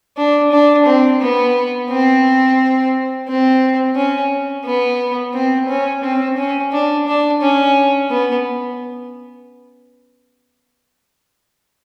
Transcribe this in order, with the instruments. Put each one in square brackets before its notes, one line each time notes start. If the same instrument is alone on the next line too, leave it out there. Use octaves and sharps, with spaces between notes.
[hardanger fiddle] D4
D4
C4
B3
C4
C4
C#4
B3
C4
C#4
C4
C#4
D4
D4
C#4
B3